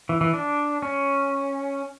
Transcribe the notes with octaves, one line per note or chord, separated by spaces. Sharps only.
E3
E3
D4
C#4